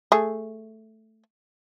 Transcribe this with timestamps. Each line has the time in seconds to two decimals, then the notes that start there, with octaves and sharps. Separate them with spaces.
0.12 A3 G#4